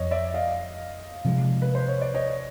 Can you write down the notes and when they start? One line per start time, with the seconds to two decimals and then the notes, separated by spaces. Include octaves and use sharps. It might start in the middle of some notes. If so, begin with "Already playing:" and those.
Already playing: F2 C#5 D#5
0.11 D5 E5
0.34 D#5 F5
1.25 C3 F3 G#3
1.62 B4
1.75 C5
1.88 C#5
2.02 D5
2.14 C#5 D#5